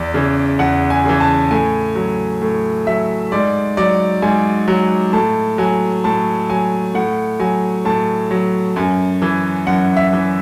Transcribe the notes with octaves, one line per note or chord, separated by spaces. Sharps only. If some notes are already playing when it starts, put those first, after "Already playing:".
Already playing: E2 D5
C#3 E3
E2 F#5
G#5
C#3 E3
A5
A2 G#5
F#3
A2
F#3 E5
G#2 D5
F#3 D5
G#2 G#5
F#3
A2 A5
F#3 G#5
A2 A5
F#3 G#5
A2 F#5
F#3 G#5
A2 A5
F#3
F#2 G#5
E3
F#2 F#5
E5
E3